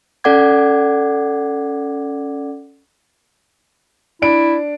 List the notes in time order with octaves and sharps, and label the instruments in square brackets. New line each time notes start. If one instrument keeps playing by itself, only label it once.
[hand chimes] C#4 A4 D5 F#5 D6 G#6
[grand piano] D4 D7 [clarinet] E4